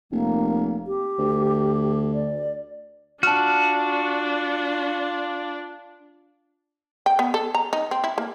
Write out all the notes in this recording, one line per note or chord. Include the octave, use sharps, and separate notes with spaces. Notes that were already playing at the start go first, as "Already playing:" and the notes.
F1 A#3
G4
D2
D5
D4 F4 F#4 A5 F6
G5
B3
A4
A#5
D#4
C4
E4
A#3